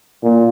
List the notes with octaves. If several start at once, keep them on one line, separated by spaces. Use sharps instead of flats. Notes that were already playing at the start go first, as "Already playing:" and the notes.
A#2